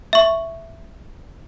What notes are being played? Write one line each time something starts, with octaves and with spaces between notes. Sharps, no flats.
E5 C#6